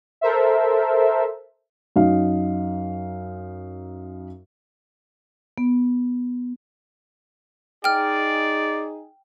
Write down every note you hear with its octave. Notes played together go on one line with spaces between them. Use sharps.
A4 A#4 C5 E5
F#2 D#4 F5
B3
D#4 G#4 D5 G5 F6